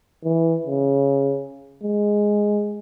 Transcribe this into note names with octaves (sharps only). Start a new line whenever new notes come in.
E3
C#3
G#3